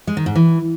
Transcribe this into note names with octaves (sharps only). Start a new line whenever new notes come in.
G#3
D#3
G#2
E3